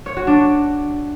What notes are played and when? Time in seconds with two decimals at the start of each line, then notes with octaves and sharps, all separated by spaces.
0.06 C#5
0.17 F#4
0.27 D4